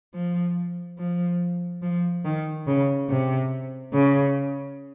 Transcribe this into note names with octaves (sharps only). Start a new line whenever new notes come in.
F3
F3
F3
D#3
C#3
C3
C#3